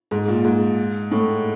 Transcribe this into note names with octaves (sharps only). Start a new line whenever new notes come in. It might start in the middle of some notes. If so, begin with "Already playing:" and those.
G#2
A#2
G#2
A2